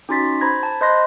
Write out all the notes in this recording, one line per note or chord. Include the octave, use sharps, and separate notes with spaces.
C#4 D#4 F#4 C6 A6 B6
C5 A#5 B5 G#6 A#6
A5
C5 D#5 B5 C6 F#6 A#6